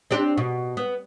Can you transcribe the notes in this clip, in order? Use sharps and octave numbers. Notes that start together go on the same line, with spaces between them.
C4 D4 G4
B2
B3